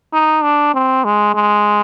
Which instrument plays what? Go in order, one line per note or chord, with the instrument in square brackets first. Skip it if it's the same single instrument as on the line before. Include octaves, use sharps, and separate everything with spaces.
[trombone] D#4
D4
C4
G#3
G#3